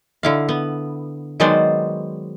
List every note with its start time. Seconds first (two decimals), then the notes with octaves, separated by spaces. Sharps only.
0.23 D3 E4 F5
0.49 B3
1.40 D#3 F#3 G#3 B3 C5 D5